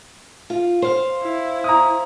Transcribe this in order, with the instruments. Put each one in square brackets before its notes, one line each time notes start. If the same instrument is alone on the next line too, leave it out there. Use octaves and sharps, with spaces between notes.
[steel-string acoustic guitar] F4
C5 F5
[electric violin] E4
[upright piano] A#5 D#6